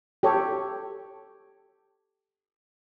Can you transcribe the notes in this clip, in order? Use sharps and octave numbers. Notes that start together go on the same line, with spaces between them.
G4 A4 C#5